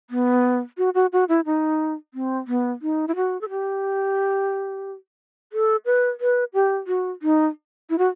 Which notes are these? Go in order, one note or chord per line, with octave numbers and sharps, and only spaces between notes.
B3
F#4
F#4
F#4
E4
D#4
C4
B3
D#4
E4
F#4
A4
G4
A4
B4
B4
G4
F#4
D#4
E4
F#4